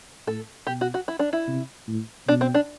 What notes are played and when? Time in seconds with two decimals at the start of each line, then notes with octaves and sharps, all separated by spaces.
0.27 A2 A4
0.67 B2 G4
0.81 F#4
0.94 F#4
1.08 E4
1.19 D4
1.33 E4
1.48 C3
1.88 A2
2.28 B2 D4
2.41 C4
2.54 D4